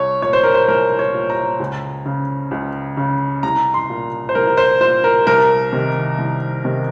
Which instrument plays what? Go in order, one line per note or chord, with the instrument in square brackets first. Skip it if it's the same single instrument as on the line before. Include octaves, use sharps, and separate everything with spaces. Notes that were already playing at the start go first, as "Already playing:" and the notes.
Already playing: [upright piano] C2 C#5
A#2 C#5
C5
A#4
C5
C2 A#4
C#5
A#2
A#5
C#2
C#3
C#2
C#3
C2 A#5
C6
A#2
C5
C2 A#4
A#4
C5
A#2 C5
A#4
C2 A#4
C3 D#3
C2
C3 D#3